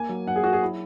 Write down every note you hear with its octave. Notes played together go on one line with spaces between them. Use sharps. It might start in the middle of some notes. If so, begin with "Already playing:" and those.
Already playing: A#3 G#5
F#3
F#3 F#5
G#4
F#3 F#4
G#4
E4